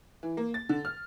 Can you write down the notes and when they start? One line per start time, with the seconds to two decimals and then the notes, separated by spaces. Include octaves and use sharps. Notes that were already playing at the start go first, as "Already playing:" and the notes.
0.23 E3
0.37 A#3
0.54 A6
0.69 D3
0.85 F6